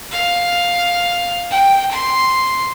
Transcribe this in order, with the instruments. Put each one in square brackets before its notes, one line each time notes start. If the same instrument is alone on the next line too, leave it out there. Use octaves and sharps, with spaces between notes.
[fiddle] F5
G5
C6